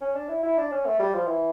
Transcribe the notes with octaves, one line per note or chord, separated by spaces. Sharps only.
C#4
D4
E4
E4
D4
C#4
A3
G3
F3
E3